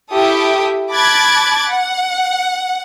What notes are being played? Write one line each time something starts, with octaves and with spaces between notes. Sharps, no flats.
E4 G4 A4 E5 D#6
A5 B5 D6 F#6 G#6 A6
F#5